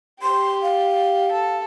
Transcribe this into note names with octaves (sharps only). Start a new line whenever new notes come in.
G4 C6
F5
A4